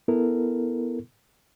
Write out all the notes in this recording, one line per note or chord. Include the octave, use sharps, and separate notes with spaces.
B3 E4 A4 A#4